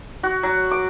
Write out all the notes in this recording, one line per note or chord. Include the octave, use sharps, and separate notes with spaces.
F#4
F#3
D6